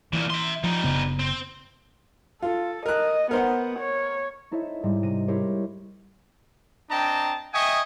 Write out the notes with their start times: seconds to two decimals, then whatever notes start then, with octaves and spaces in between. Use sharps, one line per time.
0.13 C2 A#2 E3
0.30 E5 C6
0.64 F3 G3 D#4
0.84 F#1 C#3 B3
1.19 C4
2.42 F4 A4
2.86 A#4 D#5 F#6
3.31 B3 A#4 C5 F#5
3.79 C#5
4.51 D#4 E4 A4 C5 C#5 E5
4.83 G#2 G3 D#4
5.03 C3 A#6 D#7
5.28 E4 G4 A#4 C5 C#5
6.90 C4 D4 D#5 G5 A5 A#5
7.54 D#5 E5 G5 G#5 C#6 D#6